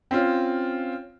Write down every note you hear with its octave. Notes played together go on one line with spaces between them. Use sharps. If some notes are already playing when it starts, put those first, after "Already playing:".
C4 C#4 F4